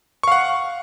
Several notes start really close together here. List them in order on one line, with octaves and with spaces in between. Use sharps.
C#6 F5 F#5